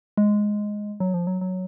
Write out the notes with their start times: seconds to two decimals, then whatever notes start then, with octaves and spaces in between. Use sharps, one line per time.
0.17 G#3
1.00 F#3
1.14 F3
1.27 F#3
1.41 F#3